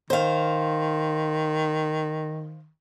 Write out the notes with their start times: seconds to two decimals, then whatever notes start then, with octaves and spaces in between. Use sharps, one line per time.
0.10 D#3 C5 F5